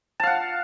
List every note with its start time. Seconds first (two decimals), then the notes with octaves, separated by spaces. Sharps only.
0.20 A5
0.23 F5
0.27 F#5